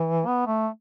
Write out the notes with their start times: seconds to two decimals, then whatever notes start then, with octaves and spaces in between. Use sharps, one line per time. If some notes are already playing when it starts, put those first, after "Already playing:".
Already playing: E3
0.26 B3
0.46 A3